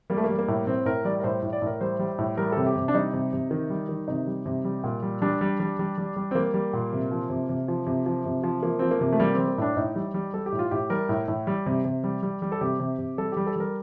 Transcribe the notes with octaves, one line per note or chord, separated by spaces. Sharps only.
G3 A#3
A3
A#3
G3
A#3
A2
A2 C4
A2 A#4
G3 D5
A#4
A2 C5
A2
D5
A2 A#4
G3 C5
G3
A2
G3 A#4
C3 A4
G4
C3
D4
G3 D#4
C3
C3
D#3
G3
D#3
C3 D#4
G3
C3
G3
A#2
G3
G3 D4
G3
G3
G3
G3
G3
C4
G3 A#3
G3
A#2
C3
F3
C3
C3
F3
C3
F3
C3
F3
F3 A#3
F3 C4
A#3
C3
A3
G3 A#3
G3 C4
A#3
A2 D4
A2 D#4
G3
G3
G3 A4
G4
A2
F4
A2 G4
G3 A#4
A2
A2
G3
C3
C3
G3
G3
G3
A4
C3 G4
C3
C3
G3 A4
G3 G4
A4
G3 A#4